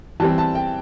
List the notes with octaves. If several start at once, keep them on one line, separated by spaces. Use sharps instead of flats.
E3 G3 C4 A5
A5
G5